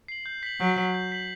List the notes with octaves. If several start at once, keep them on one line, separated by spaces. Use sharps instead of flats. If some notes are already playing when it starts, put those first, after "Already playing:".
C7 F#7
G6
B6 F#7
F#3 G6
B6 F#7
G6
B6 F#7